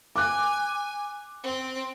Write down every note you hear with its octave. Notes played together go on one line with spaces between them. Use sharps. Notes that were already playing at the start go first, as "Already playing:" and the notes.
G#5 D6 F#6
C4